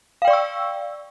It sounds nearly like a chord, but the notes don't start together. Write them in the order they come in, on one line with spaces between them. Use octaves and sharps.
F5 G5 D5 C#6 E6